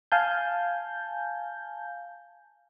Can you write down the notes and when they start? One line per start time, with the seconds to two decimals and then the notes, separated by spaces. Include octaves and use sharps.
0.12 F5 G#5 A5 G6